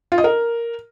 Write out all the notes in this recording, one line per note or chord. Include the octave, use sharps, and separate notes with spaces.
F4
D#5
A#4